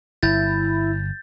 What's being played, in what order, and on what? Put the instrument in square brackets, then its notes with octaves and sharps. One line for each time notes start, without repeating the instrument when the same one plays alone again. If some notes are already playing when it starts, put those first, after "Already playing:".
[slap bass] G1 [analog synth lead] E4 [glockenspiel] G6 A6